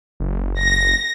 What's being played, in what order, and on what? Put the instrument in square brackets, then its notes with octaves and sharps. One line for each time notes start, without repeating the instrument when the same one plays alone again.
[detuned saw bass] F#1
[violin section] A#6